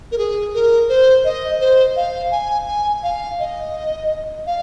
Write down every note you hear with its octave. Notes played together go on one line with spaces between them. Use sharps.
A#4
G#4
A#4
C5
D#5
C5
F5
G#5
G#5
F5
D#5
F5